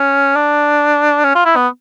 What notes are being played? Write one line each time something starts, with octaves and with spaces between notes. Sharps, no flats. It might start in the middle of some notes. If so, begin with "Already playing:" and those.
Already playing: C#4
D4
C#4
F4
E4
B3